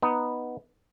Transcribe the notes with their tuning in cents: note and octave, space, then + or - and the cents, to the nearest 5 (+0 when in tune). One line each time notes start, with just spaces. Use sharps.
B3 +0 D#4 +0